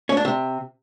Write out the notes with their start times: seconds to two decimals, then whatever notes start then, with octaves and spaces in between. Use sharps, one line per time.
0.09 C#4
0.17 D4
0.25 C3